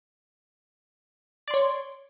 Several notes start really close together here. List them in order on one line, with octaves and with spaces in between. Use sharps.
D5 C6 C#5